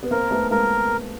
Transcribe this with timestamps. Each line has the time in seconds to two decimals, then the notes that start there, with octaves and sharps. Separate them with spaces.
0.03 B3
0.11 A#3 C4 A#4
0.31 A3 B3
0.51 G#3 A#3 A#4